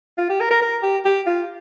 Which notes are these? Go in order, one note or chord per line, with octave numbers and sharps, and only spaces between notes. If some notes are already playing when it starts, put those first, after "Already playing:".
F4
G4
A#4
A#4
A#4
G4
G4
F4